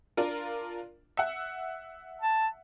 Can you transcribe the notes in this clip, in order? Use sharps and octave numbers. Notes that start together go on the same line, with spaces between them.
D4 F4 A#4
E5 F#5
A5